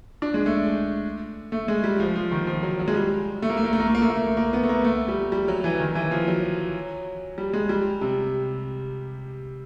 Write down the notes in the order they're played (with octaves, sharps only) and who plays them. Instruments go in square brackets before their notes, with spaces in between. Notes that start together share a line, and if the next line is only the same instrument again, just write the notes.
[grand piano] D4
G#3
A3
A3
G#3
G3
F3
F3
D#3
F3
F#3
F#3
G#3
G3
A3
A#3
A3
A#3
A3
A#3
A3
A#3
A3
A#3
A3
A#3
B3
A3
A#3
A3
G3
G3
F#3
E3
D#3
E3
F3
F#3
G3
G#3
G3
C3